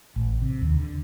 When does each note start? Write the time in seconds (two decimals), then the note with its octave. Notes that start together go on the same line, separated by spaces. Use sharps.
0.16 A1
0.42 C3
0.61 D#2
0.76 D3